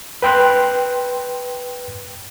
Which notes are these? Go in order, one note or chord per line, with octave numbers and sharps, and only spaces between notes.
B4 G5 C6 F#6